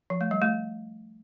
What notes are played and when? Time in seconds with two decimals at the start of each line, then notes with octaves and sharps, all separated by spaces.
0.10 F3
0.21 A3
0.31 G3
0.42 A3